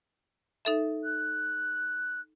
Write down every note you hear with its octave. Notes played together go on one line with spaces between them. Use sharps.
D#4 A4 E5
F#6